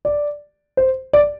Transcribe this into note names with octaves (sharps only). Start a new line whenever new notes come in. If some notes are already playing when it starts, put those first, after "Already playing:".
D5
C5
D5